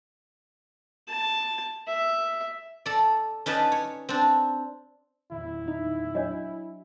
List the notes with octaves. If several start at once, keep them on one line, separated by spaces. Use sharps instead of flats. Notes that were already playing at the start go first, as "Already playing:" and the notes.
A5
E5
A4 D5
C#4 D#4 B4 D5 A5
C#5
C4 D4
E2 A#2 D#3 E4
D#4
F#3 D4 C#5 D#5